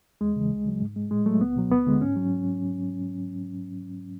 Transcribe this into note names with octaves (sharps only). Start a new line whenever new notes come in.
E2 G#3
C#3 E3
D2
C#3 F#3
G#2
G#3
A2 G#3
F#3 A3
C#2 B3
B2 F#3
D2 B3
D3 G#3
G#2 C#4
F#3